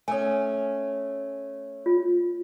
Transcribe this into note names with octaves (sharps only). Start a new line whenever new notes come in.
A3 C#4 G#5 D#6
F4